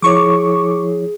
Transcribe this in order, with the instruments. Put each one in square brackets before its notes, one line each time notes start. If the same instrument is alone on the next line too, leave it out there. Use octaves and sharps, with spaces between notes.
[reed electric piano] F3 E4 C#5 [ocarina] G#4 [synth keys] C#6 D6